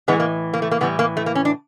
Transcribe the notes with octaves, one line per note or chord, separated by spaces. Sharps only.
A2 E3 G#3 B3
A#3
A#3
A3
A#3
A2 E3 G3 B3
A#3
A3
A#3
C#4
D4